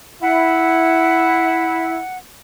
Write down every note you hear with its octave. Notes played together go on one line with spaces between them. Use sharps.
E4 F#5